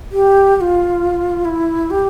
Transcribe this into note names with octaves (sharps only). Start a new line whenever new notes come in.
G4
G4
F4
E4
G4